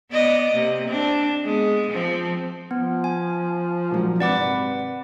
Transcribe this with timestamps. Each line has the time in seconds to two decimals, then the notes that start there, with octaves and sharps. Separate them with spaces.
0.11 B3 D5 D#5
0.52 C3 A#3
0.87 C4 D4
1.45 G#3 B3
1.90 F3 C4
2.71 F3 B3
3.04 G#5
3.91 A#2 F#3
4.20 G#1 C3 B4 D5 F#5 D6